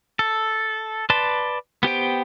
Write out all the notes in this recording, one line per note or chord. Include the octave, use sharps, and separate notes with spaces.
A4
B4 D5 A5 C6
B3 G4 C5 G5